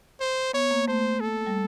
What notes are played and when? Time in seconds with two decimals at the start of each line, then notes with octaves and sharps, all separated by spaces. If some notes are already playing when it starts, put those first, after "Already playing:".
0.20 C5
0.53 B3 C#5
0.71 A#3
0.88 A3 C5
1.20 A4
1.47 G3